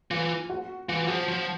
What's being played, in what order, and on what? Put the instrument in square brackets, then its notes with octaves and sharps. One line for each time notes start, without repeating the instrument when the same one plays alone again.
[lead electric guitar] E3 [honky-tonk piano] F4
[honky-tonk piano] F#4
[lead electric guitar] E3 [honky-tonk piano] F4
[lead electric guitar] F3 [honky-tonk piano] F#4
[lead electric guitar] F3